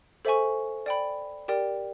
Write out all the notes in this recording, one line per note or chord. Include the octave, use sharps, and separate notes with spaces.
A4 C5 E5 G#5 C#6
D5 G5 B5
G4 A#4 D5 G5